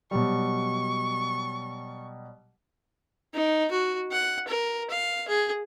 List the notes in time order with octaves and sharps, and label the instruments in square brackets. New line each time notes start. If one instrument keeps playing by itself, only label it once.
[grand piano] B2 F#3 G3 [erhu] C#6
[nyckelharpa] D#4
F#4
F#5
A#4
F5
G#4